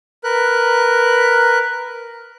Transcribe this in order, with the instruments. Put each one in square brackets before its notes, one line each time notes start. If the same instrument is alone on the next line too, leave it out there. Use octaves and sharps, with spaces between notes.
[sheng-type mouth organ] A#4 B4 F#6